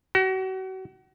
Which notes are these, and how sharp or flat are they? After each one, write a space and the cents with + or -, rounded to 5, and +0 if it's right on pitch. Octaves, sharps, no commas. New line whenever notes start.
F#4 +35